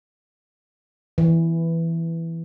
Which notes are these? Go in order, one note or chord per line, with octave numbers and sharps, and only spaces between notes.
E3